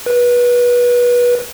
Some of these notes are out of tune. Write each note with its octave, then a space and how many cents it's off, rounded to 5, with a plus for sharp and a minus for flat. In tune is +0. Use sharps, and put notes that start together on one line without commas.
B4 -25